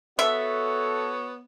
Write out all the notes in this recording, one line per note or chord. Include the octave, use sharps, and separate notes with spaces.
B3 F#4 A4 C#5 E5